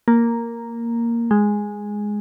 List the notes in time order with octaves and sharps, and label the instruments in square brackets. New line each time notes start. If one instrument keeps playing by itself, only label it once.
[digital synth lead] A#3
G#3